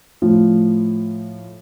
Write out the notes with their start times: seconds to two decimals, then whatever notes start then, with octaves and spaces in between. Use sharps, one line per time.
0.22 A2 F3